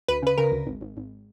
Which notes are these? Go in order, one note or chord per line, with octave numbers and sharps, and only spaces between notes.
D2 B4
C#3 B4
C#3 A#4
D2
G#1
G#1
G#1